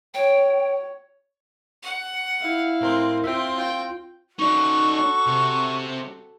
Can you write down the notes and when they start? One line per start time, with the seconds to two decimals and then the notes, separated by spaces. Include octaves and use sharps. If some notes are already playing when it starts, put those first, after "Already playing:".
0.14 C#5 G5
1.83 F#5
2.41 E4 F5
2.81 A2 C4 A#4 C6
3.24 C4 F4 E5 G5
3.58 F4 G5
4.39 D#4 F#4 A4 D5 C#6
5.26 C3